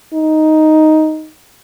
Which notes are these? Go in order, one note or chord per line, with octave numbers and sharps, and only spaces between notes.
D#4